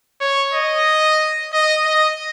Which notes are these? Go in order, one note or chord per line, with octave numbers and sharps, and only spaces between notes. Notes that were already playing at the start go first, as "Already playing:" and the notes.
C#5
D#5
D#5
D#5